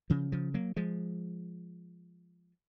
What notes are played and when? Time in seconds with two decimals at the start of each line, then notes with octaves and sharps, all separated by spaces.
0.10 C#3 F3
0.32 C#3 F3
0.54 F#3 A#3
0.76 F3 G#3